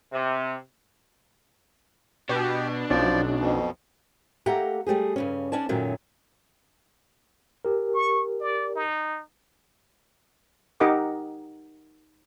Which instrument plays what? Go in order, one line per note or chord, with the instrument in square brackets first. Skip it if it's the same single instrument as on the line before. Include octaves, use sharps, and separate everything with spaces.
[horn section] C3
[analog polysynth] B2 [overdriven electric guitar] D4 [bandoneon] G4
[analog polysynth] B1 [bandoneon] F3 D5 [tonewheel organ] C#4 D#4 F#4
[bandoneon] F2 B2
[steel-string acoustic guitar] A3 A#3 G4 A4 F#5 A#5
G3 A3 G4 G#4
G2 C#3 C#4
C#4 D4 D5 A5
F#2 A#2 D#3 F#3 A3 C#4
[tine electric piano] G4 A#4
[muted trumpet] C#6
D5
D#4
[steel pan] D#4 G4 A#4 D#5 F#5 D6